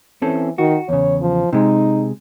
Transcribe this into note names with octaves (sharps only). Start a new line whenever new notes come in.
E3 C4 C#4 A4
D#3 F#4
E2 C#3 C#5
F3
C3 G#3 D#4